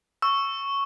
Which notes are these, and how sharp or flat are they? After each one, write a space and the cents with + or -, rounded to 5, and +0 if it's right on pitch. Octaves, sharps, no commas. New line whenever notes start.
C#6 +0 E6 +10